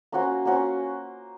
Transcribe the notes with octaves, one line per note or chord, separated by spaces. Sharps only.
A#3 C#4 F#4 C5
A#3 C#4 F#4 C5